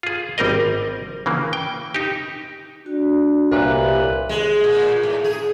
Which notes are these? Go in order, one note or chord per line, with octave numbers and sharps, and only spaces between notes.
F4 G#4
G#1 G3 C4 A#4 D#5
C#3 E3 A#3
G5
D#4 G4
D4 F#4
C2 A#2 G4 B4 C#5 E5
G#3
A#2
A2
G#4